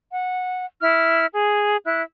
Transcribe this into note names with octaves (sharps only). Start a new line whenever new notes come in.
F#5
E4 F6
G#4
E4 F#6